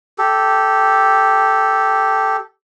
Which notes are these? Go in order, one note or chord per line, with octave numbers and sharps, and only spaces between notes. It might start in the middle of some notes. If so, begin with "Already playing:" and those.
G4 A4